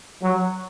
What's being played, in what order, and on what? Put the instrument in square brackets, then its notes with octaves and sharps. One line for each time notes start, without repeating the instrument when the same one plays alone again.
[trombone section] F#3